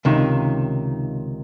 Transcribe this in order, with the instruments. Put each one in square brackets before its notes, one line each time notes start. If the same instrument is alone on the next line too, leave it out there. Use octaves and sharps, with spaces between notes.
[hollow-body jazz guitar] C#2 C3 D#3